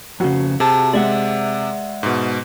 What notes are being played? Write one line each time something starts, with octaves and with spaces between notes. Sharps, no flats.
F2 C#3 F#4
C3 G#4 A5
G#3 D5 E5 F#5
G#2 B2